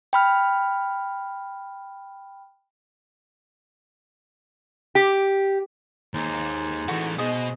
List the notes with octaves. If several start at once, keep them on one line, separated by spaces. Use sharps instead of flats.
G5 B5 F6
G4
D#2 G#2
E3 A3 F#4
B2 G#4 C5 D#5